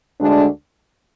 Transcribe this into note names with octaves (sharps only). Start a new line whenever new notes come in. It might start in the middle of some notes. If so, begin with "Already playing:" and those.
D2 D3 G#3 D4